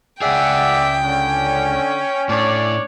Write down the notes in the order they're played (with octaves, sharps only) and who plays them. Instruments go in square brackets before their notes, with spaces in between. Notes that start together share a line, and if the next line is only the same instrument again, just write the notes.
[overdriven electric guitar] C#2 G#4 [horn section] D5 E5 [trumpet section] F#5 [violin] G5
[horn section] D3 [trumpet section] C#4
[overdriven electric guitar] A2 [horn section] D4 C#5 D5